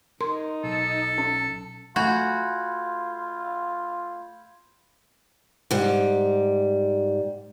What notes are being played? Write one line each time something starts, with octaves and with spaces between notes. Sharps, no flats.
D#4 A#4 C6
B1 A4
C#4
A3 F4 F#4 G#5 B5 G6 G#6
G#2 G3